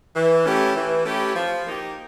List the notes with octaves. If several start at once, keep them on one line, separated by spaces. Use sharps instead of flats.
E3
A3 C#4 E4 G4
E3
A3 C#4 E4 G4
F3
A#3 D#4 G4